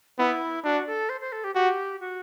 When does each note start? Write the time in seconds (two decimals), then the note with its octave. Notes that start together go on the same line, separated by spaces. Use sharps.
0.18 B3 E4
0.64 D4 F#4
0.87 A4
1.09 C5
1.21 C5
1.32 A4
1.44 G4
1.55 F#4 G4
2.01 F#4